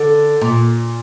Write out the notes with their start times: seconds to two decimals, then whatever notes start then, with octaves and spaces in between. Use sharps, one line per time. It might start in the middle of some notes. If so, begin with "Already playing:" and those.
Already playing: D3
0.41 A#2